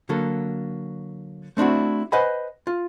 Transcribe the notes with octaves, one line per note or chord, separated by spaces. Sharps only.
D3 F#3 A#3 A4
A3 C4 D4 E4 F#4
B4 C5 D#5 F#5 G#5 B5
F4